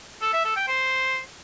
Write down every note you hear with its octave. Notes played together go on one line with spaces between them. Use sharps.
A4
E5
A4
G5
C5